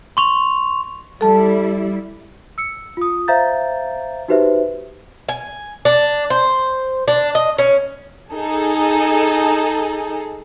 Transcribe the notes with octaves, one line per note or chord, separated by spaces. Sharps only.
C6 C#6 F7
G3 E4 A4 A5
E6 C#7
F4 D#6
C5 E5 F5 A#5 G6 A6
D#4 F#4 G4 B4 C5 E5
G#5
D4
C5
D4
D#5
C#4
D#4 G#4 A4